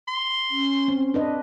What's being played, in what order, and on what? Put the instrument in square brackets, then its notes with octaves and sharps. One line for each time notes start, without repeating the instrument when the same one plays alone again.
[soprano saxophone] C6
[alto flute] C#4
[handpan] C4
D4 B4 D#5